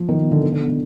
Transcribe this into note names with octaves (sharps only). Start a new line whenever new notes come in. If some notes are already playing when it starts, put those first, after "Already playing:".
Already playing: F3
D#3
B2
D3
D#3
D3
B2
D3